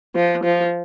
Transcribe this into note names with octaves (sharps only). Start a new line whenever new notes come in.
F3
F3